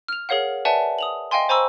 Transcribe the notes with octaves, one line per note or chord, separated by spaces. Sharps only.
F6 F7
G#4 A#4 C#5 F5 F#5
B4 D5 E5 F#5 G#5 A5
D#6 F7 F#7
D#5 F5 G5 G#5 C6
C5 G#5 A#5 B5 C#6 E6